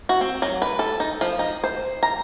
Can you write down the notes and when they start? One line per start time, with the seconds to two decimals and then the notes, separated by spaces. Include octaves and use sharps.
0.09 F#4
0.21 C4
0.42 F#3
0.62 B4
0.79 A4
1.00 D#4
1.21 F3
1.39 D#4
1.64 C5
2.03 A#5